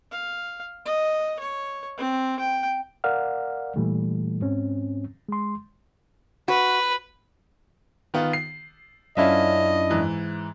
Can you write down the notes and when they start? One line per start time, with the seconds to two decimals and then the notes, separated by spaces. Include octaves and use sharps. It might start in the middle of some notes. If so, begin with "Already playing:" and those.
0.12 F5
0.85 D#5
1.39 C#5
1.98 C4
2.39 G5
3.04 A#4 D5 F5 F#5 F6
3.76 A#2 E3 G3 A3
4.41 G#2 C4 C#4
5.29 G#3 C6
6.48 F#4 B4
8.14 D#3 B3 F4
8.33 C7
9.17 F#2 C#4 D4 E4 F4 D#5 E5
9.90 G#2 E3